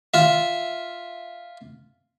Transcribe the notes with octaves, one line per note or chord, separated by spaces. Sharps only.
F4 E5